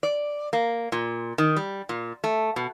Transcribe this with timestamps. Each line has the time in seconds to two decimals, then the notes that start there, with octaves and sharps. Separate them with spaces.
0.03 D5
0.53 A#3
0.92 A#2
1.38 D#3
1.56 G3
1.89 A#2
2.24 A3
2.56 B2